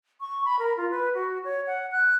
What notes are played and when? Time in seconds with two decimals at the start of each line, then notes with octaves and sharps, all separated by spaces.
0.21 C#6
0.45 B5
0.59 A#4
0.77 F4
0.91 B4
1.14 F#4
1.44 C#5
1.67 F#5
1.92 F#6